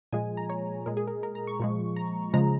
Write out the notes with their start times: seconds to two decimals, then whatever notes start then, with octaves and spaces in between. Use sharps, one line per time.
0.12 A#2 F3 G#3 G#5
0.37 A#5
0.49 C#5
0.86 A#2 G#3 A#4
0.97 G#4
1.08 A#4
1.23 A#4
1.35 A#5
1.47 C#6
1.60 A#2 F3 G#3
1.96 A#5
2.33 C#3 F3 G#3 A#5